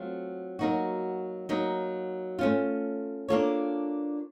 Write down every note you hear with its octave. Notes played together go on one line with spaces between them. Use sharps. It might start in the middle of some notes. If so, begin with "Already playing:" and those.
Already playing: F#3 A3 C4 F4
F#3 A#3 D#4 F#4
F#3 A#3 D#4
A3 C#4 F4
A#3 D4 F4 A4 C#5